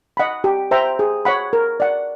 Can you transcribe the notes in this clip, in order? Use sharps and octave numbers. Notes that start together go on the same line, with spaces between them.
D#5 F#5 B5
G4
C5 E5 G5 A#5
G#4
C#5 F#5 B5
A#4
D5 F#5